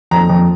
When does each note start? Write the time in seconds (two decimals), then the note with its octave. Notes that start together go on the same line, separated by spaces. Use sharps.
0.11 F2 A#5
0.29 F2